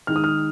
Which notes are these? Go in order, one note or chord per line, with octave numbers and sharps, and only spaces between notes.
D#3 G#3 D#4 F6
D#6
F6